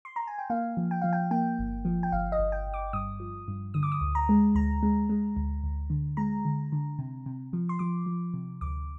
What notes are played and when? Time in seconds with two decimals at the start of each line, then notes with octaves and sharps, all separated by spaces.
0.05 C6
0.16 A#5
0.27 G#5
0.39 G5
0.50 A#3 F5
0.77 F3
0.91 G5
1.02 F3 F5
1.13 G5
1.31 A#3 G5
1.59 G1
1.85 F3
2.03 G5
2.12 G1 F5
2.32 D#5
2.39 G1
2.52 G5
2.67 G1
2.74 D6
2.93 G2 D#6
3.20 F3
3.48 G2
3.74 D3 D#6
3.83 D6
3.92 D#6
4.01 D2
4.15 A#5
4.29 G#3
4.55 D2 A#5
4.83 G#3
5.09 G#3
5.37 D2
5.64 D2
5.90 D3
6.17 G#3 A#5
6.45 D3
6.72 D3
6.98 C3
7.26 C3
7.53 F3
7.69 C6
7.79 F3 D6
8.06 F3
8.34 C3
8.61 D2 D6